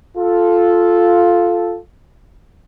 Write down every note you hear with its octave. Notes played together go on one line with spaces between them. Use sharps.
F4 A4